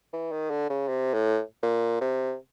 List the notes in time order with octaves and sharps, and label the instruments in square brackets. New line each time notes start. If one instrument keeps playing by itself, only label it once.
[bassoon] E3
D#3
D3
C#3
C3
A2
A#2
C3